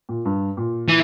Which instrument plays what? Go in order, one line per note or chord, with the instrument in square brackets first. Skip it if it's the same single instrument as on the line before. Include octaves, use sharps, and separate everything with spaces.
[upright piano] A#2
G2
A#2
[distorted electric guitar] E3